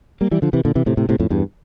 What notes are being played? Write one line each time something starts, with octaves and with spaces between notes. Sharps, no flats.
G3 A#3
E3 G3
D3 F3
C3 E3
A#2 D3
C3 E3
A2 C3
A2 C3
A2 C3
F2 A2
E2 G2